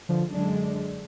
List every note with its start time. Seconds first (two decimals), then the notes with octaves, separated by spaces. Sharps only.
0.09 D3 F3
0.29 F#2 D3 G#3 D4